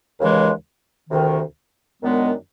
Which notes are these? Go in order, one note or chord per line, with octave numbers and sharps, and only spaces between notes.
D#2 C#3 E3 G#3
D2 C3 D#3
F#2 D#3 G#3 B3 D4